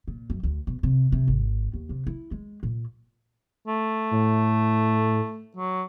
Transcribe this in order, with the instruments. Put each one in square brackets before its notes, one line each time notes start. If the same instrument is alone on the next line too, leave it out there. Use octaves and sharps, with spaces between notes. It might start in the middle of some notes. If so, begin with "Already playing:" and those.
[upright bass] A#2
F#2
D2
B2
C3
C3
G#1
D#2
C3
E4
G#3
A#2
[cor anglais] A3
[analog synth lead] A2
[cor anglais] F#3